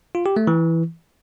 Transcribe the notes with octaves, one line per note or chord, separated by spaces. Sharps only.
F4
G4
A3
E3